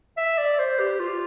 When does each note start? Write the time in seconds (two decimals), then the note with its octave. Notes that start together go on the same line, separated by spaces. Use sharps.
0.17 E5
0.38 D5
0.59 C5
0.79 G4
1.00 F4